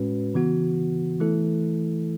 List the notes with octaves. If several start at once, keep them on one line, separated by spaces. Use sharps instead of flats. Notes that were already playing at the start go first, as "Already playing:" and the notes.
Already playing: A2 G#3 C#4 F#4 B4
C#3 E3 B3 F#4
E3 A3 E4 A4